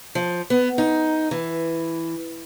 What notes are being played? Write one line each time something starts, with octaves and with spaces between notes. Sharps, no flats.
F3
B3
D#4
E3